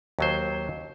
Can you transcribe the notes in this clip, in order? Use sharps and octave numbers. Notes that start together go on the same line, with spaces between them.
D#2 F#3 C5